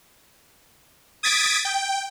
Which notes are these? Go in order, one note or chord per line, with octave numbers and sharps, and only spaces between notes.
D#6 G#6 A6 B6 D7
G5